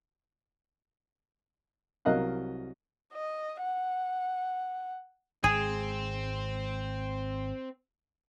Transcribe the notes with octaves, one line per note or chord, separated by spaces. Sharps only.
C2 F#3 A#4 D#5 F5 F#6
D#5
F#5
G#1 G#3 C4 G#4